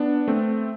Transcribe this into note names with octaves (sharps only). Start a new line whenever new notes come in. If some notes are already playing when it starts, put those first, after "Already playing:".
Already playing: B3 D4
A3 C4